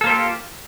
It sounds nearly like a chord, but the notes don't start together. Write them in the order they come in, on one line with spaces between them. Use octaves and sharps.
A4 A#3 C5 G4 F4